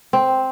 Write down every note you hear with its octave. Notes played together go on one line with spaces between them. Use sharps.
C4